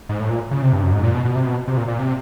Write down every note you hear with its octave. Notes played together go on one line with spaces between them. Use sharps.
G#2
A2
A#2
C#3
C3
G2
F#2
G#2
A#2
B2
B2
C3
B2
C3
A#2
A#2
C3